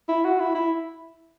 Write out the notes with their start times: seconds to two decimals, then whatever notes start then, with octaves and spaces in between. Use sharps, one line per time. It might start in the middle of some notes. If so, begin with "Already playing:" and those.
0.09 E4
0.25 F#4
0.40 E4
0.55 E4